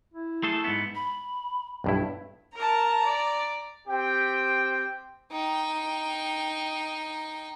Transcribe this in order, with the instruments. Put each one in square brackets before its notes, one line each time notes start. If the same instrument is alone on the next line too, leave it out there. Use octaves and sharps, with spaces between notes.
[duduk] E4
[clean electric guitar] A3 G#4 A4
G#2 B3
[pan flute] B5
[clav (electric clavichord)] B1 G2 E4
[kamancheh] A#4 A5 [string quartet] A#5
[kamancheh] D5
[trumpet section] C4 G4 G5
[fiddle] D#4 G5